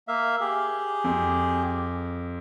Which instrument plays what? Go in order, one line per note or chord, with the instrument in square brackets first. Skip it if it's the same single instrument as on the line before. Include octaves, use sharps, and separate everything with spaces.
[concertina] A#3 E5 F5
G4 G#4
[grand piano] F2